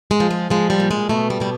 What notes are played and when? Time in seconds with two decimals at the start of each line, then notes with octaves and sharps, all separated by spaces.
0.11 G#3
0.20 F3
0.31 G#3
0.50 F3 G#3
0.70 G3
0.80 A#2
0.91 G#3
1.09 B2 A3
1.30 G3
1.40 B2 G3